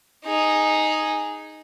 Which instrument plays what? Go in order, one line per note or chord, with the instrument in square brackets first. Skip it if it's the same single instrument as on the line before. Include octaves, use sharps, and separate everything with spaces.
[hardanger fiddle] D#4 G#4